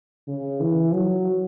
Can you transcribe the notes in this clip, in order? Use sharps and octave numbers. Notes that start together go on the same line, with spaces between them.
C#3
E3
F#3